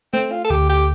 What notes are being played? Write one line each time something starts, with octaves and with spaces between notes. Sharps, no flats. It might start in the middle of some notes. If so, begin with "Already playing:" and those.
A3 C4
F4
A4
D2 G4
G4